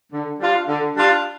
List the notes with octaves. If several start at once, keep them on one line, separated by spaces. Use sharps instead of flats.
D3
G3 D4 F4
D3
G3 D4 F4